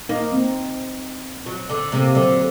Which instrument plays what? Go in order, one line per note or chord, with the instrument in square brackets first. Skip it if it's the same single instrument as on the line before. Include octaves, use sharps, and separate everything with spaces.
[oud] A#3 [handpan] D#4
[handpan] C4
[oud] F#3
D3
[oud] C3 [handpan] A#3
[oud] D3 [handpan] F#3